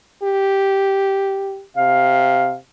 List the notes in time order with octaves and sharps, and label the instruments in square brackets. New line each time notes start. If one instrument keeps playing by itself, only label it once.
[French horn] G4
[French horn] C3 [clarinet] F5